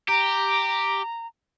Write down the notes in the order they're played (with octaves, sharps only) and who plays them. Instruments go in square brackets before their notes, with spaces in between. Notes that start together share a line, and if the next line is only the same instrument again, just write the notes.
[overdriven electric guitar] G4 [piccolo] A#5